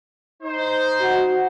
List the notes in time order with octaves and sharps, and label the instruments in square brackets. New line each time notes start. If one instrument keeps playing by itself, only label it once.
[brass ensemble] D#4 C5
[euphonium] F#4